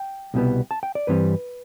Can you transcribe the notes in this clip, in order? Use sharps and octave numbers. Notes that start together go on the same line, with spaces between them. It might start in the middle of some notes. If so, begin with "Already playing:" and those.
Already playing: G5
C2 B2 G3 B3
A5
G5
D5
G2 E3 G3 C4 B4